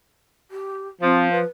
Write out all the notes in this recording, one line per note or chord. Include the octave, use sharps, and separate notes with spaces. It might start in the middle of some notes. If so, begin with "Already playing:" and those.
G4
F3 C4
B4